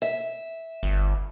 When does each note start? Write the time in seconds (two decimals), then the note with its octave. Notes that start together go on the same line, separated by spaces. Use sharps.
0.02 E5
0.83 G1